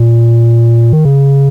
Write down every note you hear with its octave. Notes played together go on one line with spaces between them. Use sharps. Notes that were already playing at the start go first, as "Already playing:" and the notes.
Already playing: A#2
D#3
C#3